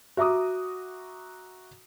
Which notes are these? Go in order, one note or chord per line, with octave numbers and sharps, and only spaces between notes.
F#4 E5 A#5 D6 D#6